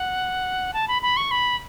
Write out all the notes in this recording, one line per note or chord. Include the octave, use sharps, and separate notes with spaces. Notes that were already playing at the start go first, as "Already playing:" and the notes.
Already playing: F#5
A5
B5
B5
C#6
B5